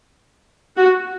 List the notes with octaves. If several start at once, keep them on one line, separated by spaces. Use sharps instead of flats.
F#4